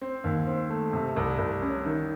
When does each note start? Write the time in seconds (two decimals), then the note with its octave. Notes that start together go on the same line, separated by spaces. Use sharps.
0.01 C4
0.24 D#2
0.47 C4
0.70 A3
0.93 C3
1.16 C2
1.38 C2
1.62 C#4
1.85 D#3